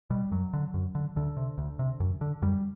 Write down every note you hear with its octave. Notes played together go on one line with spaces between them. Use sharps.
B2 G3
F#2 F#3
D3
F#2
D3
D2 D3
C3
D2
C3
F#2
D3
F#2 G3